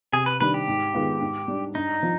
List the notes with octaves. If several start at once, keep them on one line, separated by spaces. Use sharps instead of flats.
C3 G#4
B4
D#3 G3 D4 B4
G4
G#2
D#3 G#3 B3 F4
G#2
G3 D4
G2 D#4
F3